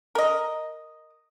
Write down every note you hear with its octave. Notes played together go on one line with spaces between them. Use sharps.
A#4 D#5